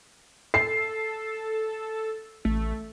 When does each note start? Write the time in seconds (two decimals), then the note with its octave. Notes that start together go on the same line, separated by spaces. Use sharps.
0.54 A4 C7
2.45 A1 A3